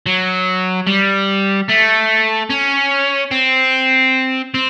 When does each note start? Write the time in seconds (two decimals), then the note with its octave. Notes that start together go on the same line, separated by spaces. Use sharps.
0.06 F#3
0.87 G3
1.68 A3
2.50 C#4
3.32 C4
4.54 C4